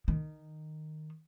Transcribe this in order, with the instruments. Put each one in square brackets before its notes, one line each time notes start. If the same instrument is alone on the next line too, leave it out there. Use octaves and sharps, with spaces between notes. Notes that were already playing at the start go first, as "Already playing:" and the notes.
[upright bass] D#3